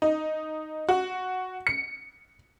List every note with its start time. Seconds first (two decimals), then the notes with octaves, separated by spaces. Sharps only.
0.02 D#4
0.89 F#4
1.67 C#7